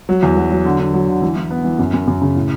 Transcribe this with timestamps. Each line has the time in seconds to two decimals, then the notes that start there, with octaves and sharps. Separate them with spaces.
0.09 F#3
0.23 E2
0.37 F#3
0.51 F#3
0.65 D3
0.80 D3
0.94 F#3
1.08 D3
1.22 E3
1.37 E3
1.50 B3
1.65 E3
1.79 F#2
1.94 F#2
2.08 F#2
2.22 C#3
2.36 A2